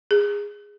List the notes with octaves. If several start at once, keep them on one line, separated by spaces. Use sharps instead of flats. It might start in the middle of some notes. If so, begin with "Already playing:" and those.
G#4